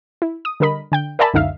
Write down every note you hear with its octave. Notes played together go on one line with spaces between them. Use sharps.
E4
D#6
D3 G3 A#4 D#5 B5
D3 G5 G6
A#4 D5 E5 G#5 A5 B5
C#2 F#2 D3 D#4 E5 F5